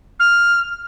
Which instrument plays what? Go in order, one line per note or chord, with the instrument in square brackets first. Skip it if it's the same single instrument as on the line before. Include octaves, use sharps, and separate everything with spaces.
[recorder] F6